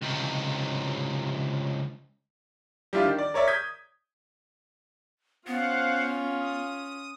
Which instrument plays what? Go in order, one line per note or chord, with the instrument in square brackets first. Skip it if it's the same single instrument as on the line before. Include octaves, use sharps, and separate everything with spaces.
[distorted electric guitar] C#2 C3
[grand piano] G3 D4 E4 F4
D#3
D5
A#4 C#5 D5 E5
D#6 G6 G#6 B6
[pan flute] B3 [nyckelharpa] C#4 F4 [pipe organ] C5 F5 F#5
[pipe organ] D#6